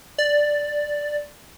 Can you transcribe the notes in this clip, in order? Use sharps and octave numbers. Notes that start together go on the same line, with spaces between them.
D5